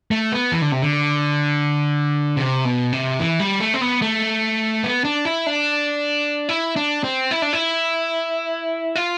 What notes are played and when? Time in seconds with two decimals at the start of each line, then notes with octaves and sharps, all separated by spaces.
0.11 A3
0.32 B3
0.53 E3
0.62 D3
0.72 C3
0.82 D3
2.37 C3
2.65 B2
2.93 C3
3.20 E3
3.39 G3
3.60 A3
3.74 C4
3.81 B3
4.02 A3
4.84 B3
5.04 D4
5.25 E4
5.46 D4
6.49 E4
6.76 D4
7.04 C4
7.31 E4
7.42 D4
7.53 E4
8.95 F4